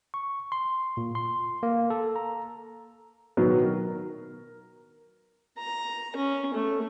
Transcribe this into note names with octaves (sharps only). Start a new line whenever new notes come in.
C#6
C6
A#2
C6
A#3
A4
A#5
B2 D#3 F#3 B3
A#4
A#5
C#4
A3